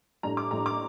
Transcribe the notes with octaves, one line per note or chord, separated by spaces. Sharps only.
A2 G3 D4 A#5
D6
A2 G3 D4 A#5
D6